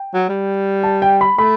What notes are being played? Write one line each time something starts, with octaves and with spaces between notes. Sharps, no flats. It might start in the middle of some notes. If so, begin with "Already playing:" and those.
Already playing: G5
F#3
G3
A5
G5
B5
A3 B5